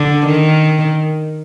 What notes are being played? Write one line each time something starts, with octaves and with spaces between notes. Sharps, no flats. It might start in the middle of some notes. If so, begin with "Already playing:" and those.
Already playing: D3
D#3